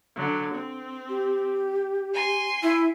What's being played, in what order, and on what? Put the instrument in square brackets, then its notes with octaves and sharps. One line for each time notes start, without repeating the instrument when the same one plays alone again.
[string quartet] D3 F#3
C4
[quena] G4
[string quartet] G#5 C6
[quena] E4